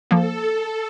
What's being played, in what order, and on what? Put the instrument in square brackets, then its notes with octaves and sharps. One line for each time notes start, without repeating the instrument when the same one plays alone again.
[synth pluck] F3 A#3 [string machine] A4